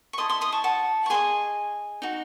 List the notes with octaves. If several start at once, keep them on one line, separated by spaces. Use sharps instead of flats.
C#6
E4 A4 D#5 C6 D#6
C6 D#6
C6 D#6
A5 C#6
F#5 A5
C#6
G#4 C5 D#5 G#5 C6
D#4 F#4